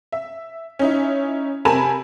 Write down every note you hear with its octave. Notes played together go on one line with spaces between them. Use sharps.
E5
C#4 D#4 E4
C3 A#4 G#5 A5 B5 E7